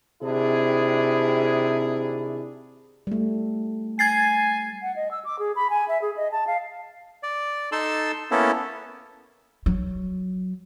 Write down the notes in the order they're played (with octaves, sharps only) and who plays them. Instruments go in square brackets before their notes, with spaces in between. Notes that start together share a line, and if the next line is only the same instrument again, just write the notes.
[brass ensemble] C3 D#3 D4 E4 G#4
[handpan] G3 A3
[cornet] G#5 [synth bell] G#6 A6 C7
[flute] F#5
D#5
E6
D6
G#4
B5
G#5
E5
G#4
D#5
A5
F5
[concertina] D5
D#4 A4 A5 C6 E6
A#3 B3 C#4 E4 A4
[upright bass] F#3